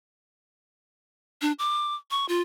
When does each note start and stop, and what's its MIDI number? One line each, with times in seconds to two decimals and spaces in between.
1.42 1.52 62
1.59 1.95 86
2.11 2.26 85
2.29 2.42 65